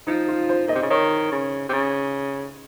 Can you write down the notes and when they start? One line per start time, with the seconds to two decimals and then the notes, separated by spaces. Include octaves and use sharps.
0.07 F3 D#4
0.28 F4
0.49 C5
0.67 A#2 D#5
0.75 C3
0.82 C#3
0.90 D#3 C#5
1.32 C#3
1.69 C3
1.73 C#3